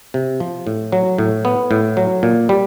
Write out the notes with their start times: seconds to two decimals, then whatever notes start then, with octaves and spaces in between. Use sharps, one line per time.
0.14 C3
0.40 F3
0.67 A2
0.92 F#3
1.18 A2
1.45 B3
1.71 A2
1.97 F#3
2.23 A#2
2.49 G3